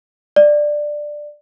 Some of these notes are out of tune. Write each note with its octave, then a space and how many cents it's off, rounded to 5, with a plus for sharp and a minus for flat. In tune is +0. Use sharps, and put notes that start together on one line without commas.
D5 +10